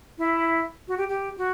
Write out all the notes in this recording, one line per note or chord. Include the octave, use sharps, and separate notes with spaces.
E4
F#4
G4
G4
F#4